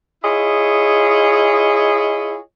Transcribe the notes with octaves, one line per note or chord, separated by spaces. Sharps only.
E4 F4 G#4 C#5 D#5